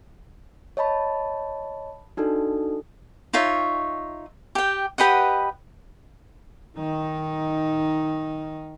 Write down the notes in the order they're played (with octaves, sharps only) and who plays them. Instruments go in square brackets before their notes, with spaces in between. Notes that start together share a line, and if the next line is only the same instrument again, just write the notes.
[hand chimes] C#5 D#5 A5 B5
D4 D#4 F#4 A4
[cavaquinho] D#4 F4 C#5 E5
G4 G5
G4 B4 D#5 F#5
[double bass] D#3 D#4